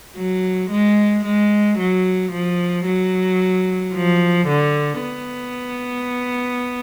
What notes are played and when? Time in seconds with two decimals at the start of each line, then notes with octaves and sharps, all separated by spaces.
0.16 F#3
0.71 G#3
1.25 G#3
1.79 F#3
2.32 F3
2.86 F#3
3.94 F3
4.48 D3
5.01 B3